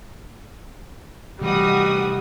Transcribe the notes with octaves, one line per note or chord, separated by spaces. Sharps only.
C3 E3 G3 A3 D#4 F#4 D#6